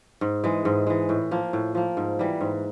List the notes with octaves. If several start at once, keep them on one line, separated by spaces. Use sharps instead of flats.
G#2
E3 G#3
G#2
E3 G#3
A2
F3 A#3
A2
F3 A#3
G#2
E3 G3
G#2